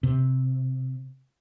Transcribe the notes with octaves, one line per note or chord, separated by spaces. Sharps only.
C3